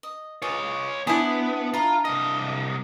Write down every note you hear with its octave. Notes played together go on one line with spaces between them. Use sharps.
D#5
F4 G#4 B4 C#5 D#5
B3 D4 E4 C5 G#5 D#6
F4 A#5 B5
C2 D#5 F5